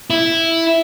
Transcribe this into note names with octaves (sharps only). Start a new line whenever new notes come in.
E4